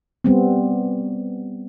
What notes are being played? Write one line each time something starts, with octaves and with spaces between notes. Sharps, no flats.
G3 B3 C4